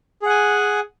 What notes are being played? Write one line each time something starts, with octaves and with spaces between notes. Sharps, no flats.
G#4 F#5 G#5